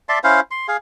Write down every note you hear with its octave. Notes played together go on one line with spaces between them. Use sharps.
D5 E5 A5 C6
C#4 E4 C5 F5
C6
G#4 F5